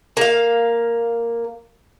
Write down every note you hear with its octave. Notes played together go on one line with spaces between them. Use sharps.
A#3 F5